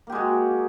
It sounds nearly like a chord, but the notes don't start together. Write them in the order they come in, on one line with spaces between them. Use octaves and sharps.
A#3 G4 G#3 F#4